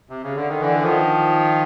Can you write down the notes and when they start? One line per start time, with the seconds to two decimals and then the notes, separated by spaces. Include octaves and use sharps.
0.10 C3
0.23 C#3
0.36 D3
0.49 D#3
0.61 D3 E3
0.82 D#3 F3